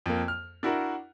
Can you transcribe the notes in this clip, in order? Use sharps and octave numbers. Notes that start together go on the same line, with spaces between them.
F2 A#3
F6
D4 E4 F#4 A#4